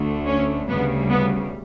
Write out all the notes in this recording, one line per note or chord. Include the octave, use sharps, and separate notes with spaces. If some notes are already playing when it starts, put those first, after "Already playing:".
Already playing: D2 D3 A3
C#4
D2 C#3 G3 B3
B3